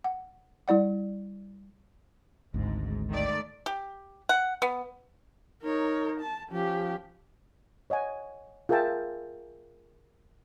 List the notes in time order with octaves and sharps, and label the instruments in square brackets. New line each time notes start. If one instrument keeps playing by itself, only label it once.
[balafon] F#5
G3 E4 D5 F#5
[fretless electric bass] G#1 D2 [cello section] G#2
[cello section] D#3 A3 D5
[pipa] G4
F#5
B3
[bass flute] D#4 [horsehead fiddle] A#4 C#5
[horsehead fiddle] A5
[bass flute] F3 [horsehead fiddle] C#4 G4
[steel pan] C#5 D#5 F#5 G#5
F4 G#4 A#4 E5 G5 A5